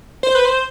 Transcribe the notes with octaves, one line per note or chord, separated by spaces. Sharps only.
C5
B4
C5